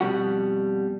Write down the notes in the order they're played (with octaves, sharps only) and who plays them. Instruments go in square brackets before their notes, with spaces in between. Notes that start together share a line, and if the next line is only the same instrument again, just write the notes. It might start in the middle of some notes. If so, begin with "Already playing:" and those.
[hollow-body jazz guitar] F2 B2 G3 F#4